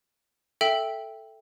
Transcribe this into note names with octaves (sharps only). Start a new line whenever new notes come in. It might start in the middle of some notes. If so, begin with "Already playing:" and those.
A4 E5 G5 F#7